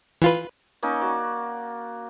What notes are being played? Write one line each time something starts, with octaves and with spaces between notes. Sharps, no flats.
E3 F4 B4
A#3 C#4 D#4
F#4 D5